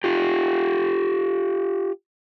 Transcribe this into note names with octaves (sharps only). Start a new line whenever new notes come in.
F4 G4